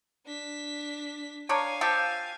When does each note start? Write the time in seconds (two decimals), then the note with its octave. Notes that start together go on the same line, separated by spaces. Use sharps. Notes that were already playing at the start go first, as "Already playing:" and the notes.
0.26 D4 B6
1.49 D4 A#4 C#5 F5 G#5
1.81 F3 G4 A4